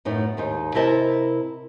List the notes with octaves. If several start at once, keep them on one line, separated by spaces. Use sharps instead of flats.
F#2 A2 B3 D#4
D#2 G#2 D#4
C3 E4 A#4 D#5 A5